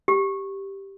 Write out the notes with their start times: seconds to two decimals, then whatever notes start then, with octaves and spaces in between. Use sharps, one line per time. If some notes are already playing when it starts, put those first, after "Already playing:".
0.08 G4